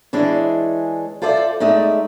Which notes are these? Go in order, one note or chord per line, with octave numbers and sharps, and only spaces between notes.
E3 G#3 D4 G#4 C#5
F4 A4 C5 D5 E5
G#3 A3 D#4 D5 E5